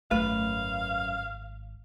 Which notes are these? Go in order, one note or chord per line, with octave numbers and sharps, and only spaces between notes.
G#1 F#2 A3 B4 F5